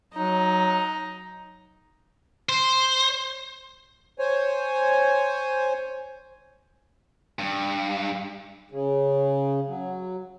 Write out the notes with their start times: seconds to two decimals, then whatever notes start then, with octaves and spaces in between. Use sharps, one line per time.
0.14 F#3 D#4
2.49 C5
4.19 C5 C#5 G#5
7.39 G2
8.71 C#3
9.67 F#3